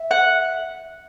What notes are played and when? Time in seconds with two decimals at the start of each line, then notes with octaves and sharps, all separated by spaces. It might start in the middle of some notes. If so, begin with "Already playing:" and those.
Already playing: E5
0.11 F#5